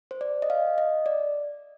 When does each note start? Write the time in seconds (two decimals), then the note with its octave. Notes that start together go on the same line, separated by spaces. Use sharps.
0.11 C5
0.21 D5
0.42 D#5
0.50 F5
0.78 D#5
1.06 D5